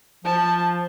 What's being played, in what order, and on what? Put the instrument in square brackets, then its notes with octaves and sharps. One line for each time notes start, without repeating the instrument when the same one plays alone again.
[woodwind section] F3 [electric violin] A5